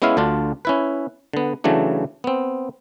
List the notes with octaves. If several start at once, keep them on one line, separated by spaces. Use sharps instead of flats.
G#3 B3 C#4 E4 E5 F5
D2 D3 D4 F4
C#4 E4 B4
D3 B3
C#3 E3 F#3 A3 D4
B3 C4